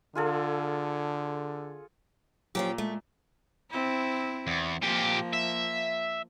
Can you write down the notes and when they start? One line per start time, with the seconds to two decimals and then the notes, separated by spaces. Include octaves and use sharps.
0.15 D3 F4 G#4 A4
2.55 A#2 F3 F#3 C#4 G4
2.78 G#3 A3
3.71 C4 E4
4.47 E2
4.82 A#2 F3 A#3 G4
5.33 E5